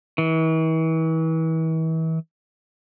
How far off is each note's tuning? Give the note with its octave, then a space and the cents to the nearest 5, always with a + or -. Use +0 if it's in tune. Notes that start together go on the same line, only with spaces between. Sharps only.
E3 -40